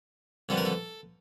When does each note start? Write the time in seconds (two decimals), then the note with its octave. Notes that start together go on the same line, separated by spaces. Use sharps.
0.49 F2 D3 G3 B3 A4
0.58 A#4
0.65 A4